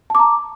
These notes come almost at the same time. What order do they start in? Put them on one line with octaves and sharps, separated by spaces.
A5 D6 A#5